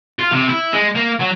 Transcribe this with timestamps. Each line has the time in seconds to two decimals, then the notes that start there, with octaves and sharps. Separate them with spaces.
0.19 F4
0.32 C3
0.49 E4
0.73 G#3
0.95 A#3
1.19 F#3